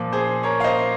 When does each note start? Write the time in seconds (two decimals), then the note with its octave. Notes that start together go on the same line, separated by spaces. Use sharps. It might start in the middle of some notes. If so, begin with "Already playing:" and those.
Already playing: A#2 F3
0.13 G#4 C5
0.43 A#4 C#5
0.60 F5
0.64 C5 D#5